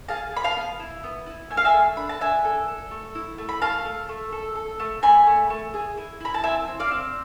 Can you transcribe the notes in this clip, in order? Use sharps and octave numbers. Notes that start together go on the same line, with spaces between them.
G#4 F5 A5
G#4 B5
F5 A5
B3
E4
B3
E4
A3 G#5
F5
E5 G#5
A3
D4 B5
A5
D4 E5 G#5
A4
A4
A3
E4
A3
B5
A3 F5 A5
A3
A3
A4
A4
A3
A3 G#5 B5
A3
A3
G#4
E4
E4 B5
A5
C4 E5 G#5
C4
D5 F5
C4